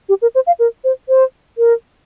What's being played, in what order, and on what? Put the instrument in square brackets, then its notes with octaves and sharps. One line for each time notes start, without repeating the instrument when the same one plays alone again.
[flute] G4
A#4
C5
F5
A#4
C5
C5
A#4